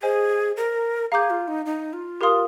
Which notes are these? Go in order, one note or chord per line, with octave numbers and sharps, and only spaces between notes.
G#4 C5 D#5 G#5
A#4
G#4 F5 A#5 D6 G6
F4
D#4
D#4
F4
G4 A#4 F5 C6 D#6